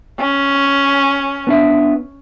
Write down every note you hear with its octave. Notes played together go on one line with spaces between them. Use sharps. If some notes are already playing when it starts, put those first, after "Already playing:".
C#4
B3 D4 E5